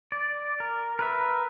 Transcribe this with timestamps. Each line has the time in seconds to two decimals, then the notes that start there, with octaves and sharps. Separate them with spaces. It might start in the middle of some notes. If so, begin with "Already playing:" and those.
0.12 D5
0.60 A#4
0.99 A#4 B4 E5